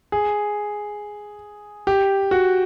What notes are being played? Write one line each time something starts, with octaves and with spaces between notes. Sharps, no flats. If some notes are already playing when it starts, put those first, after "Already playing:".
G#4
G4
F#4